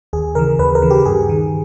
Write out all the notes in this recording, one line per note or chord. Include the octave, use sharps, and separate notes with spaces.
D#2 G#4
C#3 E3 A#4
D#2 B4
A#4
C#3 E3
G4
G2 G#4
D#3